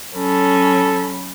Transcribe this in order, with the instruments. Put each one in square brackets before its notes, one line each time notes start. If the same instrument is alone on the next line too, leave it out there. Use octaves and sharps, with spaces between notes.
[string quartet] F#3 C#4 B5 [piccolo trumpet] A4